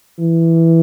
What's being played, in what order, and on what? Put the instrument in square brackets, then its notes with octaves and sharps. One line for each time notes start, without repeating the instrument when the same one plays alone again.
[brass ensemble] E3